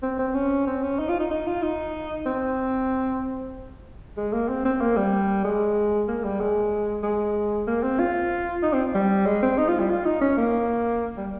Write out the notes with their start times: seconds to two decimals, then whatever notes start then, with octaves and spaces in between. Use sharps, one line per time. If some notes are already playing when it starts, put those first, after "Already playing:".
0.03 C4
0.19 C4
0.35 C#4
0.67 C4
0.83 C#4
0.99 D#4
1.09 F4
1.20 D#4
1.31 D#4
1.47 F4
1.62 D#4
2.26 C4
4.17 G#3
4.33 A#3
4.49 C4
4.65 C4
4.81 A#3
4.97 G3
5.44 G#3
6.08 A#3
6.24 G3
6.40 G#3
7.03 G#3
7.67 A#3
7.83 C4
8.00 F4
8.63 D#4
8.73 C4
8.95 G3
9.26 G#3
9.43 C4
9.58 D#4
9.68 F4
9.80 G3
9.90 F4
10.05 D#4
10.22 C#4
10.38 A#3
11.17 G3